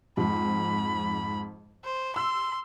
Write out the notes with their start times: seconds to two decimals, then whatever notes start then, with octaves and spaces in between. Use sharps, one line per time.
0.17 F2 G#2 B5
1.85 C5
2.16 C6 E6